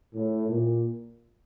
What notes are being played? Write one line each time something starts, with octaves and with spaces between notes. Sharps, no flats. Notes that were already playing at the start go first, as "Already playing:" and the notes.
A2
A#2